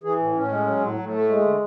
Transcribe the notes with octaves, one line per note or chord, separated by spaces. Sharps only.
E3 G#4
A2
A2 C#4
G#3
F#3
A2
A2
A3
G#3
D3